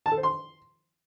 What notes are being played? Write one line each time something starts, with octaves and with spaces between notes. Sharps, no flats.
A5
A4
C5
C6